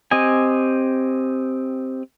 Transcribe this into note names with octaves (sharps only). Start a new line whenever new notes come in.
C4 G4 D#5 G#5